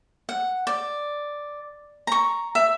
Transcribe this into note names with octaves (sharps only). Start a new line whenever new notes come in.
F#5
D5
A#5 C#6
E5